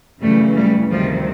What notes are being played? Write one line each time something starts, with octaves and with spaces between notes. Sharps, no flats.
F#2 C#3 E3 G3 A3
G3 A3
D2 C3 D#3 F3 G3